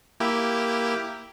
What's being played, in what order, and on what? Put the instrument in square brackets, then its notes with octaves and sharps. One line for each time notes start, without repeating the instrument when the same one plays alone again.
[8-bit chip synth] A#3 E4 G4